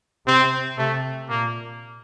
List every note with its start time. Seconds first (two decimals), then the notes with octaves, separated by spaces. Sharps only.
0.27 C3 C4
0.78 C3 A3
1.29 A#2 A#3